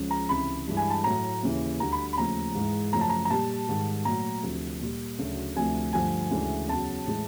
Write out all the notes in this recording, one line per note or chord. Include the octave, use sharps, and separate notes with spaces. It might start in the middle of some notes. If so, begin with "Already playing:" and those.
Already playing: C#2 C#3 F3 G#3
A#5
C#2 C3 E3 B5
G2 E3 G#3
G#5
A5
A2 F#3 A3 A#5
D#2 C#3 E3
D2 D3 G3 A#5
B5
B5
D#2 C#3 F3 A3 A#5
G#2 E3 G#3
F#2 C#3 F3 A3 A#5
A5
A#5
A#5
A#2 G3 A5
G#2 D#3 G3
A#2 F#3 A3 A#5
D2 C3 F3
A#2 G3
D2 C#3 F#3
D2 C3 F3 A3 G#5
G2 D3 F3 A3 G#5
D2 C#3 E3 G#3
E2 C#3 F#3 A5
A2 E3 G#3